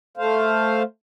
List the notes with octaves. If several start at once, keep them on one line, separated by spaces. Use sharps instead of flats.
A3 C5 F5